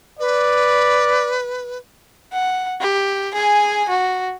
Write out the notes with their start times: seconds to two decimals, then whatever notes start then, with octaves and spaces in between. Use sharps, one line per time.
0.19 B4 D5
2.33 F#5
2.81 G4
3.34 G#4 G#5
3.89 F#4